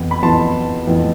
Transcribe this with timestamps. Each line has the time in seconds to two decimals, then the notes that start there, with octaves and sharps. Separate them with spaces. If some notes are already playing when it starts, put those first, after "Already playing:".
Already playing: F2 E3 B3
0.11 B5
0.23 F2 E3 B3 E4 A5 C6
0.87 F2 E3 B3 E4